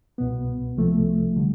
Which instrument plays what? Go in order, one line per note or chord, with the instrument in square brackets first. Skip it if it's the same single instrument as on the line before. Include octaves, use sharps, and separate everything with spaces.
[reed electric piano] C2 B2 B3
C2 C3 F3 A3
D3 G3